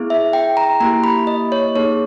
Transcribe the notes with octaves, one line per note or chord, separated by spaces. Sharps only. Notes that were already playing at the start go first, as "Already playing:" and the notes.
Already playing: B3 E4 G#4
E5
G5
A#5
A#3 E4 G4 A#5
B5
D#5
C#5
A#3 D#4 G#4 C#5